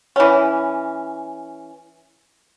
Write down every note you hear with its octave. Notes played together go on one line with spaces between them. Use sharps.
E3 C#4